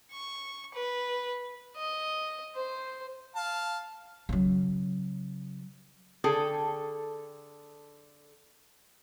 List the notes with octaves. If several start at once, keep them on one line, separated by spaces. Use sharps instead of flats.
C#6
B4
D#5
C5
F5 A5
C#3 F#3
D3 G#4 A4 G5